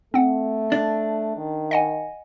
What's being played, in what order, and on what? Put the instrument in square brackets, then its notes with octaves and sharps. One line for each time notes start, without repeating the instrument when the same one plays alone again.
[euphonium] A3 [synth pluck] C4 F#5
[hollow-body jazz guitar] D4
[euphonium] D#3
[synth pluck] D#5 F#5 G#5